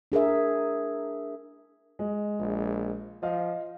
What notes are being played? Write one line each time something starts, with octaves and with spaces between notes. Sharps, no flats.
D4 G#4 A#4 E5
G#3
A#1
F3 D#5 F5